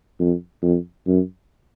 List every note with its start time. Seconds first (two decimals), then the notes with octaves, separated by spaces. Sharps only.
0.20 F2
0.63 F2
1.07 F#2